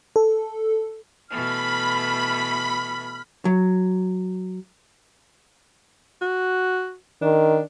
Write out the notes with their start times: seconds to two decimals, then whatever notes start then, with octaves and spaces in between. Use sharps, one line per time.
0.16 A4
1.29 B2 E3 A3 B5 F6
3.45 F#3
6.21 F#4
7.22 D#3 D4